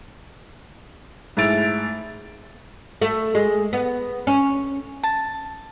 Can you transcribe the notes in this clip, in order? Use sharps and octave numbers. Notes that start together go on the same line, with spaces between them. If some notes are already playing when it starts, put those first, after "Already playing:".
G#2 A3 E4 A6 D7 F7
A3
G#3
B3
C#4
A5